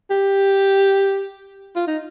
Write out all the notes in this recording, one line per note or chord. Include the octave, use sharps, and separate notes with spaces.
G4
F4
D#4